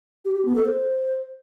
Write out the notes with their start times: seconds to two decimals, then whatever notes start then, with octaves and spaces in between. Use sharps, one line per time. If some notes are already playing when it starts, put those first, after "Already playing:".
0.25 G4
0.35 G4
0.45 B3
0.55 A4
0.66 C5